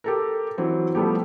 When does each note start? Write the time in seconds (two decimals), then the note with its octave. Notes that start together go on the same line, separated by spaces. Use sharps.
0.04 G4 A4 A#4
0.58 E3 F#3 C4
0.95 F3 G3 A3 B3 G4